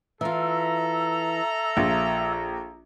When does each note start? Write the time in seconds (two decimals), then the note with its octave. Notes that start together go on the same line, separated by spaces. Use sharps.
0.21 E3 F4 A4 E5 A#5
1.77 A#1 F4